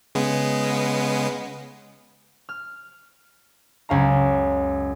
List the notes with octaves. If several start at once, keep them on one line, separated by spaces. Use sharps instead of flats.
C#3 G#3 B3
F6
C#2 F#2 F5 A#5